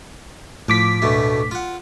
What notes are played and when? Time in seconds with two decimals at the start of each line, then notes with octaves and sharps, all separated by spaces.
0.68 A2 F3 D6 B6
1.02 D2 B2 A3
1.51 F4 F#5